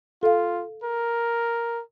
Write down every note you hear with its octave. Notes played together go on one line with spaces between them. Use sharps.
F4 A4 F5
A#4